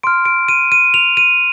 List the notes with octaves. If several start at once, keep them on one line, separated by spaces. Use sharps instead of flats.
C6 F6 D7
D7
D#7
D#7
F7
D#7